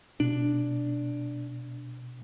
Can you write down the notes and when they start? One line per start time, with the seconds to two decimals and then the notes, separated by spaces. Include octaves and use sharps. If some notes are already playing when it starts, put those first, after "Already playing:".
0.20 B2 D4